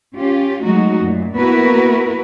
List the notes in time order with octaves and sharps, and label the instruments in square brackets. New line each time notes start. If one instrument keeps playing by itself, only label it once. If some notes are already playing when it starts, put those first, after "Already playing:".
[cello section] C#4 F4 G4
F#3 G#3 A3 D#4 F#4
F#2 A#2
A#3 B3 E4 F#4 A#4 B4